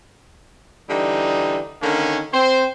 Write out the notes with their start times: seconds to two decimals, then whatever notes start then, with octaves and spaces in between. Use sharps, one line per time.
0.89 D3 E3 G3 D#4
1.82 D3 D#3 A#3 C#4
2.33 C4 C5